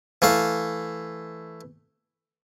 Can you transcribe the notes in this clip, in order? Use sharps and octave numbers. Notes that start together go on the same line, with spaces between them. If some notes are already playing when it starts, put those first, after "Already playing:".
E3 A3 F5